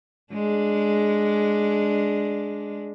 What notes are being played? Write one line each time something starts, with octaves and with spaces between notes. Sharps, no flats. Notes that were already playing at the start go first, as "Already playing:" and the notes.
G#3 D4